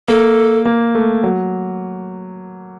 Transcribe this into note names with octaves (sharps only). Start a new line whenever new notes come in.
A#3 A4
A#3
A3
F#3